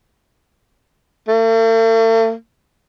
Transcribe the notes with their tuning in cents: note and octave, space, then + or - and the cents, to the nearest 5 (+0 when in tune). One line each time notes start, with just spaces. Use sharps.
A3 +45